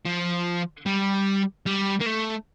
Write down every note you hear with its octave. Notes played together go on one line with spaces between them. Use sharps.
F3
G3
G3
A#3
A3